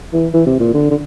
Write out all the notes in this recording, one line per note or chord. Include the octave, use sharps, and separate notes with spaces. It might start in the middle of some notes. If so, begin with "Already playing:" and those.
E3
E3
C3
A#2
D3
D3